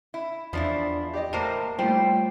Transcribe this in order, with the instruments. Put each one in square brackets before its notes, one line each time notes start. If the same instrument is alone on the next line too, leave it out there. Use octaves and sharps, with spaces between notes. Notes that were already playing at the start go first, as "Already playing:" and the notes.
[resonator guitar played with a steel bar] E4
[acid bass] E2 [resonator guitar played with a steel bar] F3 D4 E4
[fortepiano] G4 D5 D#5
[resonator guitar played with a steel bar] A2 A#3 C5 [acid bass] A#4
[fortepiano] A2 F3 [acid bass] G3 [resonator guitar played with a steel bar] C5 [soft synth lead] G5